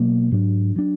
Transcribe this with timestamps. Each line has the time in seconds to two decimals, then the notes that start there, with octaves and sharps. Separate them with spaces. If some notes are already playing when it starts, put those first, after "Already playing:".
Already playing: B2 F#3 A#3
0.31 G#2 F#3 D4
0.76 F#3 D4